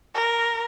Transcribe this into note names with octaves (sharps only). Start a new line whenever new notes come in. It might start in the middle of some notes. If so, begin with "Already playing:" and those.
A#4